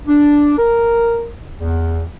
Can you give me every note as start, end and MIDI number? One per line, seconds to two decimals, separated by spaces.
0.07 0.55 62
0.58 1.28 70
1.60 2.03 40